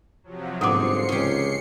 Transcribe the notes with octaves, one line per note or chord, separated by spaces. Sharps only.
C3 F3 F#3
G1 G#2 C4 A4 F#5 D6 C7 C#7
C#2 C#4 G4